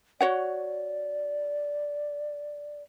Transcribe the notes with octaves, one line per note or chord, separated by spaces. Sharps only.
F#4 C#5 D5 F#5